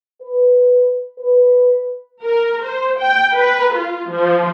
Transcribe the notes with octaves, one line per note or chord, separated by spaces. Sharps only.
B4
B4
A#4
C5
G5
B4
F4
F3